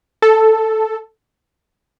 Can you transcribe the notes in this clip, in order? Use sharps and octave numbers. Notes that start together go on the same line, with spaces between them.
A4